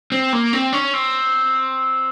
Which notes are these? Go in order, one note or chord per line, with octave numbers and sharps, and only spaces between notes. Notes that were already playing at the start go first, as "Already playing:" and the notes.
C4
A#3
C4
C#4
C4